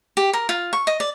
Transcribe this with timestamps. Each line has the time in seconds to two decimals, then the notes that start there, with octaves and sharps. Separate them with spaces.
0.17 G4
0.33 A#4
0.49 F4
0.73 C#6
0.87 D#5
1.00 D5